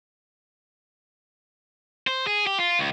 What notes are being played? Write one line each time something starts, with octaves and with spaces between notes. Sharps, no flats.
C5
G#4
G4
F4
C#2